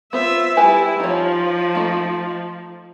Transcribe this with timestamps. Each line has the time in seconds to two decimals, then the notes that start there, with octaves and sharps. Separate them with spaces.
0.13 B3 F4 C5 E5
0.57 G3 E4 G4 G#4 B4
1.00 F3 D#4 C#5
1.75 A3 A#3 D#4